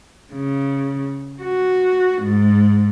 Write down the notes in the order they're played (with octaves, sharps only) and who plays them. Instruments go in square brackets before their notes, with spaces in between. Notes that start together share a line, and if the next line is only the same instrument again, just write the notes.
[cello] C#3
F#4
G#2